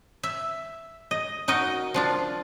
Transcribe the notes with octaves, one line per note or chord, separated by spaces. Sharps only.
E5
D#5
D#4 F#4 A#4 D#5
F3 D4 F4